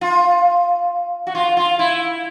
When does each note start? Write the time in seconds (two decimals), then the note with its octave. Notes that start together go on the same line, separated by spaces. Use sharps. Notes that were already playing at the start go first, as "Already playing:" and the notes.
0.01 F4
1.27 F#4
1.35 F4
1.57 F4
1.79 E4